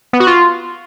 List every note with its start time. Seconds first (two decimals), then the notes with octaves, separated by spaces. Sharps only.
0.13 B3
0.20 F#4
0.27 F4